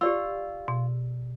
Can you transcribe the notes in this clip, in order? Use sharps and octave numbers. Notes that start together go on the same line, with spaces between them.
F4 G4 D5 E6
B2